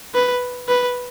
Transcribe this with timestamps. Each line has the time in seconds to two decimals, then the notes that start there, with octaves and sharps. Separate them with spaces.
0.14 B4
0.69 B4